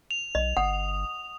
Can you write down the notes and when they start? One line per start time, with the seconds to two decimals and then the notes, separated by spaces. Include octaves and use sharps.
0.11 F7
0.35 B1 D#5
0.57 G1 F#5 D#6